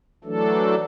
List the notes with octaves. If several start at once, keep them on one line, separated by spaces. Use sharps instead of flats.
E3 F#3 A3 D4 A4